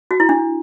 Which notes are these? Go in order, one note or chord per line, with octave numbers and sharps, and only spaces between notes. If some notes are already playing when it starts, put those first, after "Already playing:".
F#4
E4
D4